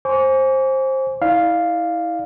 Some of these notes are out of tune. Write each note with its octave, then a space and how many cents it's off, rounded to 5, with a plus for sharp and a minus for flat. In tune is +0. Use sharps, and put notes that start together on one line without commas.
C5 +20 G#5 +0 D6 -40
E4 -30 D5 +15 F5 +0